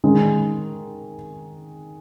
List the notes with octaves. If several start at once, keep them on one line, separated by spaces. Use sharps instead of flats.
D#3 G#3 C#4